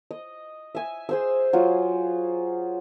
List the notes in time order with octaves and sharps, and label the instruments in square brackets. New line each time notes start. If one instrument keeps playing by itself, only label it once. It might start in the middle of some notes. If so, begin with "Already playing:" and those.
[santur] D#5
E5 G#5
G#4 C5 E6
F#3 F4